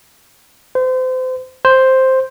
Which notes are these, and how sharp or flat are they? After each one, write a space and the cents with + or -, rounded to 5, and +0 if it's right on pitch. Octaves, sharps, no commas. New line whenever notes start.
C5 -30
C5 +5